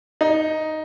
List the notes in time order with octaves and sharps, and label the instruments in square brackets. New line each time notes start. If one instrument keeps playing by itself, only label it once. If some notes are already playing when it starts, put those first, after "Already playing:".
[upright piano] D#4